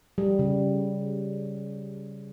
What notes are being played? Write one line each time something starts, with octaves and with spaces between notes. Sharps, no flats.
G3
C#3